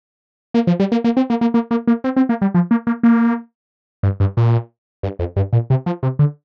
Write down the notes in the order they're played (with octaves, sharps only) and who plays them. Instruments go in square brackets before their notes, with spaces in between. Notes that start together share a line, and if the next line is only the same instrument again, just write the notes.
[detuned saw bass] A#3
F3
G3
A#3
A#3
C4
A#3
A#3
A#3
A#3
A#3
C4
C4
A#3
G3
F3
A#3
A#3
A#3
G2
G2
A#2
G2
F2
G2
A#2
C3
F3
C3
D3